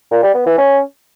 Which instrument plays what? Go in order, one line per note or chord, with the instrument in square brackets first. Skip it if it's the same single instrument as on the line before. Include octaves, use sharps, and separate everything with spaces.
[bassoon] A#2
G3
B3
E3
C#4